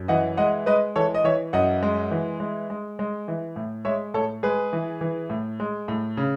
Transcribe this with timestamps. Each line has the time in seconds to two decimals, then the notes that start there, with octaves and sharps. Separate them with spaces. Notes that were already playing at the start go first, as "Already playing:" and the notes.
Already playing: F#2
0.08 E3 D#5 F#5
0.37 G#3 D#5 F#5
0.66 G#3 B4 D#5
0.96 E3 A4 C#5
1.15 D#5
1.24 E3 C#5 E5
1.53 F#2 D#5 F#5
1.83 G#3
2.11 E3
2.40 G#3
2.70 G#3
2.99 G#3
3.28 E3
3.56 A2
3.85 G#3 C#5 E5
4.14 A2 A4 C#5
4.43 G#3 G#4 B4
4.73 E3
5.01 E3
5.30 A2
5.60 G#3
5.88 A2
6.17 C#3